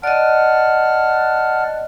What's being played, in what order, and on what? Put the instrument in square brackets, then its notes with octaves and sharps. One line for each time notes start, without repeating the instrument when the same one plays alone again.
[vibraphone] D5 D#5 [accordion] F#5 A5 F6